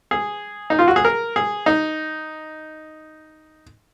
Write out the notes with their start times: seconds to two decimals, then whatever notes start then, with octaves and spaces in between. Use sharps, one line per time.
0.11 G#4
0.70 D#4
0.79 F4
0.88 F#4
0.96 G#4
1.05 A#4
1.36 G#4
1.66 D#4